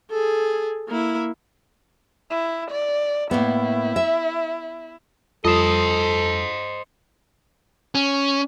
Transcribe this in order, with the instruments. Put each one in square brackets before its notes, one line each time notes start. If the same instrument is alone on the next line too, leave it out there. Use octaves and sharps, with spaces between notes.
[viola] G#4 A4
A#3 E4
[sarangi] E4
D5
[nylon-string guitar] A2 A#3 B3 [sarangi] E4
[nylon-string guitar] E5
[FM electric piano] F2 G3 [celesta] F4 D#6 E7 [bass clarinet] A4 [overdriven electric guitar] C5 D#5
[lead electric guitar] C#4